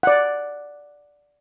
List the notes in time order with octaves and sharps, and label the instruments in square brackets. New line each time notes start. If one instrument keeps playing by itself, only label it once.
[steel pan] D5 F#5